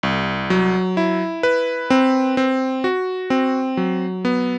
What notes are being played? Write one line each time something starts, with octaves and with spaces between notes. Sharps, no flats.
C2
F#3
E4
B4
C4
C4
F#4
C4
F#3
B3